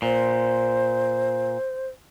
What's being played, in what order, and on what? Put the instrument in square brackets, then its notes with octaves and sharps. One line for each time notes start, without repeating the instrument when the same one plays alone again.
[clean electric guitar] A#2 [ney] C5